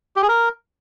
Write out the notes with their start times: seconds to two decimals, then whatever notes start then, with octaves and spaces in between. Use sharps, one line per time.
0.16 G4
0.22 G#4
0.28 A#4